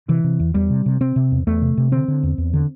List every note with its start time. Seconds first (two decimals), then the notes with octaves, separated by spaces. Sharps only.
0.09 C3 E3
0.24 C3
0.40 E2
0.54 E2 G3
0.70 C3
0.86 C3
1.00 C3 C4
1.16 C3
1.32 E2
1.47 E2 A3
1.62 C3
1.78 C3
1.92 D3 C4
2.08 D3
2.23 E2
2.38 E2
2.54 D3